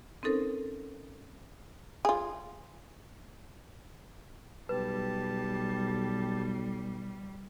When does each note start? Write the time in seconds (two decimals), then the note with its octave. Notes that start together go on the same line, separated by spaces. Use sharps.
0.23 C4 C#4 D#4 A4 A#4 C5
2.05 F4 G#4
4.69 B1 G3 G4 B4 A5